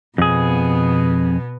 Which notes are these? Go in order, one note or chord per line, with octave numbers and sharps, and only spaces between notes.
F2 B2 B3 G#4